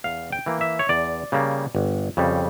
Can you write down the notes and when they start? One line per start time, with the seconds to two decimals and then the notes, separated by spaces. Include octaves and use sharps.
0.04 E2 F5
0.32 G5
0.46 E3 A#3
0.61 E5
0.79 C#5
0.89 E2 D5
1.32 C#3 G3 A#3
1.75 G1
2.17 F2 C#3 G3